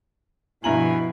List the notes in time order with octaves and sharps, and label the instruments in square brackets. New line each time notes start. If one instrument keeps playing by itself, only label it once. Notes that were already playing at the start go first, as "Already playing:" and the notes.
[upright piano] G2 A#5 F#7 [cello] B2 F3 [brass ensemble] E4 [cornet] G#5